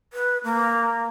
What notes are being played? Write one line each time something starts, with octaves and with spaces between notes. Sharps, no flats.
B4
A#3